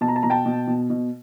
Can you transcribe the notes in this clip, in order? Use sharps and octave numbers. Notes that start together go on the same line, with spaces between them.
B2 A5
A#5
A5
B2 A#5
G5 A5
B2
B2
B2